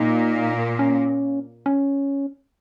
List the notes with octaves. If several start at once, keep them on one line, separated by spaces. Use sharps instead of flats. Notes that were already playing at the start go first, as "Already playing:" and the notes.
Already playing: A#2 A#3 D#4
C#4
C#4